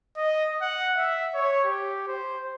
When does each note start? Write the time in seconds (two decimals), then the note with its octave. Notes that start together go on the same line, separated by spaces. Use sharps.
0.17 D#5
0.61 F#5
0.96 E5
1.35 C#5
1.64 G4
2.07 C5